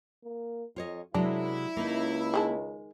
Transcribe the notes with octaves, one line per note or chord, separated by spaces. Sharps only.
A#3
F2 F4 C#5 D#5
F#2 C3 F#3 G#3 D4 E4
C#2 A#3 C#4 D#4
D#3 G#3 A5